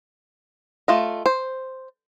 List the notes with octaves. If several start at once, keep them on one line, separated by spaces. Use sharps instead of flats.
A3 F4 D#5
C5